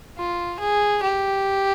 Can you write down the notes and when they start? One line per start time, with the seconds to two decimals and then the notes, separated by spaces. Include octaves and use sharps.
0.18 F4
0.60 G#4
1.03 G4